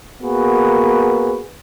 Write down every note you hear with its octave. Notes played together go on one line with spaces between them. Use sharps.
A#3 B3 F#4 G#4 A#4 B4